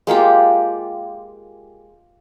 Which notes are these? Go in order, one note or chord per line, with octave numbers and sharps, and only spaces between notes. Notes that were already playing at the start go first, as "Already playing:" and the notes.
G#3 A#3 F4 G4